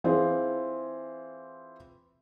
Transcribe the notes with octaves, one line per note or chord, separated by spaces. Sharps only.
E3 C4 F4 G#4